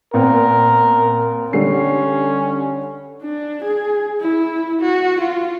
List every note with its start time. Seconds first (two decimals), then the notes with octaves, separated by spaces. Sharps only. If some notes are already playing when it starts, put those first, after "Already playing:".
0.14 A#2 B3 C4 A#4
1.53 D3 G3 C#4 C7
3.23 D4
3.64 G#4
4.21 E4
4.81 F#4
5.20 F4